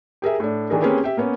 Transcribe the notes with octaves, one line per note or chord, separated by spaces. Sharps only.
G4 G#4 A#4 E5
A2 D4
D#3 E3 D4 G#4 A#4
A#3 C4 C#4 G4 G#4 B4
G4 E5
A#3 B3 C#4